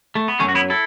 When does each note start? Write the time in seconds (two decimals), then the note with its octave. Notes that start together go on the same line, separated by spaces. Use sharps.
0.15 A3
0.28 B3
0.40 F#2 F#3 A3 C#4
0.48 F#4
0.55 B3 E4
0.70 E4 A4